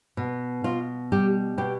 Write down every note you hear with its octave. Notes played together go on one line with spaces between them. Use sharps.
B2
B2 F4
G3 G4
B2 G4